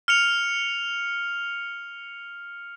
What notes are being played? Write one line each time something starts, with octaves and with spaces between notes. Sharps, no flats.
F6 C#7 F7